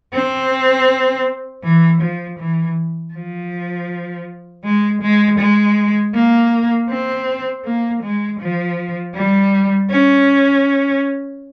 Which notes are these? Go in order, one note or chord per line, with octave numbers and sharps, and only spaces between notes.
C4
E3
F3
E3
F3
G#3
G#3
G#3
A#3
C4
A#3
G#3
F3
G3
C#4